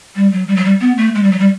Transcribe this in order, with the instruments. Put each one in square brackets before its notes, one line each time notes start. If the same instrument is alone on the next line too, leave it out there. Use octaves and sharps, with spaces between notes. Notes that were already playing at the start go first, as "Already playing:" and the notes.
[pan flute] G3
F#3
G3
F#3
G3
B3
A3
G#3
G3
F#3
G3